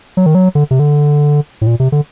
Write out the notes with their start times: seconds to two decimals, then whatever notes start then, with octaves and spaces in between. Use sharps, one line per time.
0.17 F#3
0.26 D#3
0.35 F#3
0.55 D3
0.71 C3
0.80 D3
1.61 A2
1.67 A#2
1.80 C3
1.92 D3